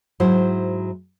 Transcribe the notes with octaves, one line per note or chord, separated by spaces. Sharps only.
G#2 F#3 E4 C5